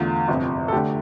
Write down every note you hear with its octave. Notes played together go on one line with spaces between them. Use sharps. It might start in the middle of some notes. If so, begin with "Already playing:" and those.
Already playing: E2 D3 A3 F4
G1 F2 C3
A4
D3 A3 G4